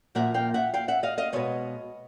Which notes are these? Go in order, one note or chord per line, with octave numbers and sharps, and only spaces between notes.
A#2 F3 A#3 E5 F#5
F5 G5
E5 F#5
F5 G5
E5 F#5
D#5 F5
D#5 F5
B2 G#3 B3 C#5 D#5